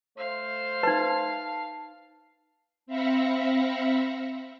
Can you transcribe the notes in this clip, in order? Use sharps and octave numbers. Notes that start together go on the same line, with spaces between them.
A3 C5 F5
D#4 B4 A5
C4 E5 F5 B5 A#6 C#7